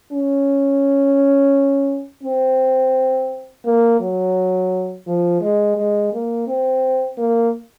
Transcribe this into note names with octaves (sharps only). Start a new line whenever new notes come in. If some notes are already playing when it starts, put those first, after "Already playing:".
C#4
C4
A#3
F#3
F3
G#3
G#3
A#3
C4
A#3